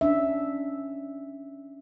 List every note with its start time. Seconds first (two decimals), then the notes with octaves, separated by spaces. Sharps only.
0.01 C#4 D4 E5